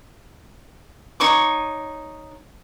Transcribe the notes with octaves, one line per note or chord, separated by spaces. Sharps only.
D#4 C#5 C#6 D6